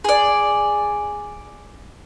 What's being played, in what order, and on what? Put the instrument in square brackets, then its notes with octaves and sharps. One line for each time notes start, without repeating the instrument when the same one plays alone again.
[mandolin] G#4 D5